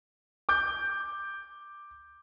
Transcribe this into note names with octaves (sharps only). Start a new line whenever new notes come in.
D6 G6